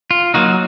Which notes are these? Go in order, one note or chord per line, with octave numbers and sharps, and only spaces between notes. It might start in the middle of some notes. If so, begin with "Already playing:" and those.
F4
F#3 A#3 D#4 F#4